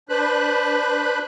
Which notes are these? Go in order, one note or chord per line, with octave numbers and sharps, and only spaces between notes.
D4 B4 C5 B5 F#6